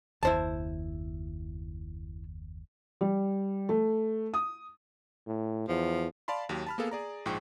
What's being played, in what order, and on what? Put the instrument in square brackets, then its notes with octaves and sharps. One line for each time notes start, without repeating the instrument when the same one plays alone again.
[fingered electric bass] F#1 D#2 [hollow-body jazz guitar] E4 C5 A5
[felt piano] G3
A3
D#6
[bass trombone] A2
[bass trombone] E2 [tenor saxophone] F3
[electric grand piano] D5 F5 A5 B5 C6
D#2 F#3 G4
A5 B5 F6
A#3 B3 G#4 A4 F5
G#4 D5 A#5
A#1 G#2 F3 G#4 G5 C#6